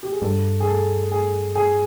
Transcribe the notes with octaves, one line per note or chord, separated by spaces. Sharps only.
G4
G#4
G2 A4
G#4
A4
G#4
G#4